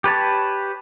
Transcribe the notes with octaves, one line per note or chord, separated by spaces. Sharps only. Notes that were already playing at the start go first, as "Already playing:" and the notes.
G4 B4 C#5 A5